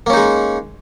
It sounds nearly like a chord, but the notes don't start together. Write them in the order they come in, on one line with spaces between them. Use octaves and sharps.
A#3 C#4 D#4 G#3